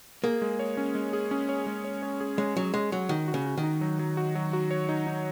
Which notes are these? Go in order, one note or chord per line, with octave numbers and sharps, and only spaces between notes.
A#3 G#4
G#3
C#5
C#4
G#3
G#4
C#4
C#5
G#3
C#5
C#5
G#4
G#3 C#5
F#3 C#4
G#3 C#5
F#3 G#4
D#3 F#4
F#4
C#3
F#4
D#3
D#4
F#3
F#3
F#4
F#3
F#4
C#5
D#4
D#4